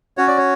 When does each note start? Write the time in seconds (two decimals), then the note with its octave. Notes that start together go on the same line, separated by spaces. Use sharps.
0.17 C#4 F#4 C#5
0.28 D5
0.38 C#5